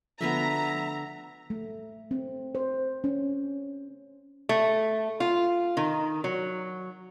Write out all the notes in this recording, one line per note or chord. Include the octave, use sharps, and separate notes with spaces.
D3 F3 A3 B3 B4 E5 A#5
A3
C4
C5
C#4
A3
F4
D#3
F#3